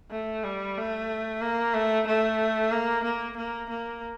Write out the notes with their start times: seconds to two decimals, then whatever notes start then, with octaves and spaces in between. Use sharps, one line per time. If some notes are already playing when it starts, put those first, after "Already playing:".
0.11 A3
0.44 G3
0.77 A3
1.42 A#3
1.74 A3
2.07 A3
2.72 A#3
3.04 A#3
3.37 A#3
3.69 A#3